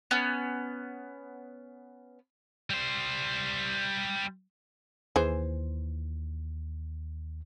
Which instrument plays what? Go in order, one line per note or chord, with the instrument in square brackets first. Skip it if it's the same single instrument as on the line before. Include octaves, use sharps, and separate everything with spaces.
[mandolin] B3 C#4
[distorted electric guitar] G3 C5
[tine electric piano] D#2 [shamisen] E3 G#4 C5